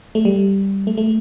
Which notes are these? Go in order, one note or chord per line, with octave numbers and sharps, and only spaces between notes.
A3
G3
A3
A3